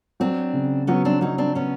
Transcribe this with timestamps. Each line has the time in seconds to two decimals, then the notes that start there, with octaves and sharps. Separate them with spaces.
0.20 F#3 C4 D4
0.54 C#3
0.87 F#3 B3 C#4
1.05 C4 D4
1.21 F#3 C#4 D#4
1.38 C4 D4
1.55 B3 C#4